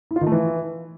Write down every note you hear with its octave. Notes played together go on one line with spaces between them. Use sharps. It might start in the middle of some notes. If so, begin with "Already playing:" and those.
E4
F4
D#3
A3
E3